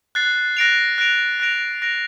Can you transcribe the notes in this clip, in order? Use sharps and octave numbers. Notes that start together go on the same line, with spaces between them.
F#6 A6 C7
F#6 A#6 D7 F7
F#6 A#6 D7 F7
F#6 A#6 D7 F7
F#6 A#6 D7 F7